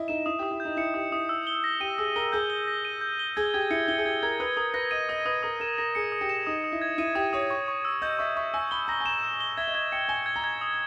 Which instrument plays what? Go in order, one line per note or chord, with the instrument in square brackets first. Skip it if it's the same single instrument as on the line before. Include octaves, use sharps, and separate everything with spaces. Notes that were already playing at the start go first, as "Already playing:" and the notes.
Already playing: [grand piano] E4 D#5
[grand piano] D#4 [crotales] E7
[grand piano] E4 [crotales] D#6
[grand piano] G4 [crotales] D#6
[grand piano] E4
[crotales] G6
[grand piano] D#4
[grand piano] E4 [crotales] C#7
[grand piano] G4 [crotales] D#6
[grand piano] E4 [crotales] D#6
[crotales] E6
G7
A#6
[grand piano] G4 [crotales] D#7
[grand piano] G#4 [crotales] E6
[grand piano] A#4 [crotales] G7
[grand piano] G#4 [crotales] G6
[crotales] G7
A#6
D#7
G6
G7
[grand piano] G#4 [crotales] G#6
[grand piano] G4 [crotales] G#6
[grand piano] E4 [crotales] C#7
[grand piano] E4 [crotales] G7
[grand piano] G#4
[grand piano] G4 [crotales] G#6
[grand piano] A#4 [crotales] G#6
[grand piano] B4 [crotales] D#6
[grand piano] A#4 [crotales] D#6
[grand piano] B4 [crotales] A#6
[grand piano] D#5 [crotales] D#7
[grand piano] D#5 [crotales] D#6
[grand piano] B4 [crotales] D#6
[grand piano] A#4 [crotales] D#6
[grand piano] A#4 [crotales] E7
[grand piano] A#4 [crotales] A#6
[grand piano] G#4 [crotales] C#7
[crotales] D#6
[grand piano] G4
[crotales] E7
[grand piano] D#4 [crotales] D#6
[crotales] D#6
[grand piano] E4
[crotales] G#6
[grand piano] E4 [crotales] D#7
[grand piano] G4 [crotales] D#6
[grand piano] C#5 [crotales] D#6
[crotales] C#6
C#6
E6
[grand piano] D#5 [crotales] G6
[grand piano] E5 [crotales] C#6
[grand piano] E5 [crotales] C#6
[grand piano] G#5 [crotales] E6
[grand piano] B5 [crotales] G7
[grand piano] A#5 [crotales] A#6
[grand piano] G#5
[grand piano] A#5 [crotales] E7
[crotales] E6
G7
[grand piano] E5 [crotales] G#6
[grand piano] D#5
[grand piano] E5 [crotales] G#6
[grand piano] G5 [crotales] C#7
[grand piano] G#5 [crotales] G7
[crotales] G#6
[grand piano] A#5
[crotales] G#6
D#6